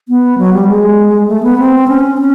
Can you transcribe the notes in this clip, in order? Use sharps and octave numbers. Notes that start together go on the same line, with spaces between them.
B3
F#3
G3
G#3
A3
B3
C4
C#4
C#4